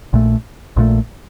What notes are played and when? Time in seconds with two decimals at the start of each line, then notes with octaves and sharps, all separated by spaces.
0.13 A#1 A#2 A3
0.76 A#1 A#2 A3